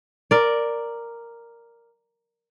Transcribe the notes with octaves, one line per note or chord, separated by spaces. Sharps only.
A#4 D5